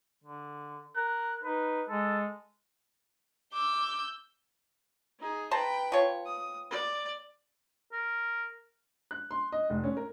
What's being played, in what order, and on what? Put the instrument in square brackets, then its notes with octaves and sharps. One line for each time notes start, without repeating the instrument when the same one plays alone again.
[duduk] D3
[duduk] A#4 [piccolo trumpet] F#6
[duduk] D#4 [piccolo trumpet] B4
[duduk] G#3 [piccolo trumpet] A4
[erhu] D6 [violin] E6 G6
[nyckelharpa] D#4 G#4
[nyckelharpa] B4 G5 [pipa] C5 A5 A#5
[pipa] F3 C#5
[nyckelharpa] D#6
D5
[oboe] A#4
[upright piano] F#6
C6
D#5
F1
C#4
A#4